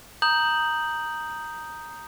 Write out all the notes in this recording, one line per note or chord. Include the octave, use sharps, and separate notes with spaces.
A#5 D#6 G6 F#7